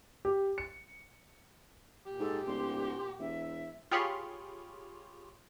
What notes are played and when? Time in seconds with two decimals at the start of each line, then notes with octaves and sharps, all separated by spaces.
0.25 G4
0.58 C#7
2.06 A#2 G4
2.19 G#2 A4
2.47 D1 C6
3.19 E1 E5
3.91 F4 G4 G#4 C#5 B5 C6